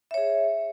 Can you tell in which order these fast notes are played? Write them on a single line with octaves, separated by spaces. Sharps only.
E5 C#5 G#4